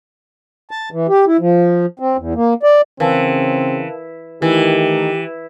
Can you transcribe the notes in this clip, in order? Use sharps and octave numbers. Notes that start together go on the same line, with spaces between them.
A5
E3
G4
E4
F3
C4
E2
A#3
D5
C#3 E3 C4 A#4 F5 A5
D#3 E3 A3 E4 G4